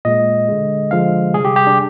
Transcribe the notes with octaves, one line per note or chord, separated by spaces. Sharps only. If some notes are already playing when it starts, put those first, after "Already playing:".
A#2 G#3 D#5
D3 G#3
D3 F3 G#3 F5
C3 G3 G#4
G4
G4
D4